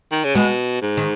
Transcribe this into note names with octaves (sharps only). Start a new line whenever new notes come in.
D#3
C#3
B2 G#3 B3
G#2
D#3